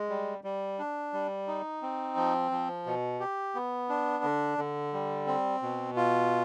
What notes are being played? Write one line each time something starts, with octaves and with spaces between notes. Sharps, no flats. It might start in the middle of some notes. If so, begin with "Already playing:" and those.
Already playing: G#3
G3
G3
D4
G3
D#4
C4
F3
F3
B2
G4
B3
D4
D3
D3
G3
C4
B2
F4